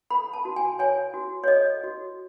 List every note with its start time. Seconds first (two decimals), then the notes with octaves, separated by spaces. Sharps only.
0.10 A4 B5
0.33 A5
0.45 F#4
0.56 G#5
0.79 C#5 G#5
1.14 F#4
1.44 C#5
1.48 A4 D#5
1.84 F#4